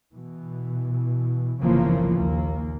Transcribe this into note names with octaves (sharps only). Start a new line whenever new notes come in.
B2 E3
G1 C2 C#3 E3 F3 A#3
A#1 D#2 A#3